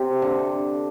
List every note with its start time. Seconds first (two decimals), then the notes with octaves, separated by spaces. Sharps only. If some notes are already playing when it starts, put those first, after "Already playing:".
Already playing: C3
0.22 D3